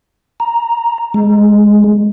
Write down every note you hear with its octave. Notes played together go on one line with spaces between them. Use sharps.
A#5
G#3